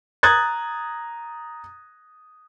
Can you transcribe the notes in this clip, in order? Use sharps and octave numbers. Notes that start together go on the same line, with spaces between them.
A#5 D#6 F#6 G#6 A6